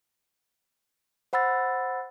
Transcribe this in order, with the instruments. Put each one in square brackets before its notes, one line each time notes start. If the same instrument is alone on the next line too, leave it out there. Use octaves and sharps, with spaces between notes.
[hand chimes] C5 F#5 B5 E6 A6